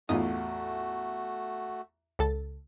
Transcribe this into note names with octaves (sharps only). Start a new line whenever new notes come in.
A1 E2 A3 D#4 F4 F#4 D#6
C#2 A4 A6